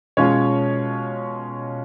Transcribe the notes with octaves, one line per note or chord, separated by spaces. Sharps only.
B2 G#3 C#4 F4 C#5